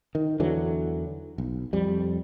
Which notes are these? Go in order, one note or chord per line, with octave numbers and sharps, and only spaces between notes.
D#3
E2 D3 E3 F#3
B1
F2 G3